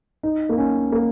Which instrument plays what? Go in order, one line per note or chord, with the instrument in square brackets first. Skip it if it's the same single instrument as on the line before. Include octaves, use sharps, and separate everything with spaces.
[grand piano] D#4
A#3
C#4
A#3